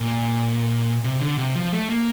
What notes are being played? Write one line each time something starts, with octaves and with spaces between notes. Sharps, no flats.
A#2
C3
D3
C3
F3
A3
A#3